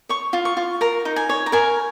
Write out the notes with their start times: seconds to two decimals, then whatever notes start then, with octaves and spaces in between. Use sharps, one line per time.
0.09 C#5 C#6
0.33 F4
0.45 C#6
0.57 F4
0.81 A#4 A#5
1.05 D#4
1.16 G#5
1.29 C#5
1.46 A#5
1.52 A#4 G#5